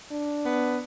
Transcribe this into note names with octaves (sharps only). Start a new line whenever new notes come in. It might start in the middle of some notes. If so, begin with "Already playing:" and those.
D4
B3